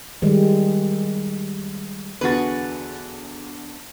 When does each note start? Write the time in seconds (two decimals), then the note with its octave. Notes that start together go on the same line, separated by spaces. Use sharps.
0.22 D#3 G3 G#3
2.21 E2 D3 F#4 G#4 B4 A6